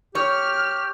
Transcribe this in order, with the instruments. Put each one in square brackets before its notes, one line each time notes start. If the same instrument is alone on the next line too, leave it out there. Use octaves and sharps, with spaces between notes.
[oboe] G4 [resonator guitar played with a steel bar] C#5 [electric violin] F6